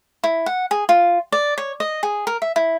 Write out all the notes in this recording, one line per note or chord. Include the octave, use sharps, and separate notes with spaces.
E4
F#5
G#4
F4
D5
C#5
D#5
G#4
A#4
E5
E4